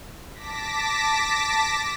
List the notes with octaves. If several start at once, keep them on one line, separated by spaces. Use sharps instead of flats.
A5 D6 A#6 B6